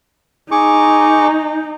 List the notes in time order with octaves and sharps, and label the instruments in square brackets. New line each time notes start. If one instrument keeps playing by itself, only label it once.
[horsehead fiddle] D#4 [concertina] G#4 C#6 D6